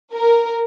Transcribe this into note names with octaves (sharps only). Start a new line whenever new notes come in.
A#4